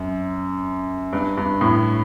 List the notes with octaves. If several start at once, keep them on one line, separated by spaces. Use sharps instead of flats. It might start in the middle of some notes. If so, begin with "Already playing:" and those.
Already playing: F#2
G2
G2
A2